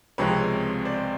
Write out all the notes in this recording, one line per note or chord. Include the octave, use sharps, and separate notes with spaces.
C#2 C3 F3 G#3 C4 B4 C#5
C5 D5